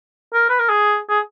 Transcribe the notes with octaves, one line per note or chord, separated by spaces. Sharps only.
A#4
B4
A#4
G#4
G#4